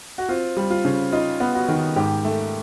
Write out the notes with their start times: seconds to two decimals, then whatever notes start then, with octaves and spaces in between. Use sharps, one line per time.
0.18 F#4
0.29 C4 F4
0.57 G3
0.70 F4
0.85 C#3
1.12 D#4 F4
1.40 B3
1.55 F#4
1.68 D#3
1.96 G#2 G4
2.25 A3